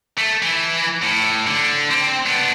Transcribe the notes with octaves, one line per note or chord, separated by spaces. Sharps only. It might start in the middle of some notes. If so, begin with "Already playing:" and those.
A3
E3
A2
D3
C4
B3 D4